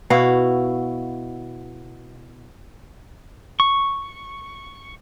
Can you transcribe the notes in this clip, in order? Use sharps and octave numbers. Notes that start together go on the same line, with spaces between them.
B2 E4 F#4 F5
C#6